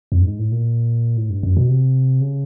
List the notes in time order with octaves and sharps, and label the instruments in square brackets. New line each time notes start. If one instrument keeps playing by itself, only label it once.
[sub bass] F2
G2
G#2
A2
A#2
A2
G2
F#2
B2
C3
C#3